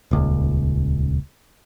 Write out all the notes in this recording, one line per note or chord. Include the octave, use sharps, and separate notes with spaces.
D#1 C#2